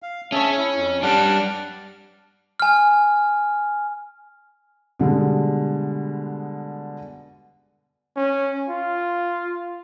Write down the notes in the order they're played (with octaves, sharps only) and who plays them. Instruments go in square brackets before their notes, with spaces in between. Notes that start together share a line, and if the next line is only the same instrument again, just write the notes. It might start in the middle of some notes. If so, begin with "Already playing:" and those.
[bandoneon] F5
[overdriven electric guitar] C#4 C#5 [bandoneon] G#4 E5 A5
[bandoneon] E4
F2
[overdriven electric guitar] G3 D4 [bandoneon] F#5 A5 F6
[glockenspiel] G#5 F6
[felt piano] B2 D3 G3 G#3
[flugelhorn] C#4
F4